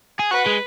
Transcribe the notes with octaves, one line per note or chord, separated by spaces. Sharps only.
G#4
F#4 B4
G#3